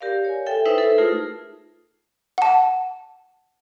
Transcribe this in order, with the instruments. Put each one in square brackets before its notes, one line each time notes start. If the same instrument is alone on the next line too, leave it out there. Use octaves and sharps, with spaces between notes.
[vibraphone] G4 A#4 D5 F5
C#5 G#5
A4 E5 G5
D#4 E4 B4 C5 E5
A4
A3 D#4 F4 G#4 A#4
[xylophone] F#5 A5